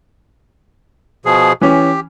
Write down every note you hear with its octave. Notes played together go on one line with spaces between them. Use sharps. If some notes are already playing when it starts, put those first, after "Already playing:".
B2 F3 G#4
E3 C#4 G4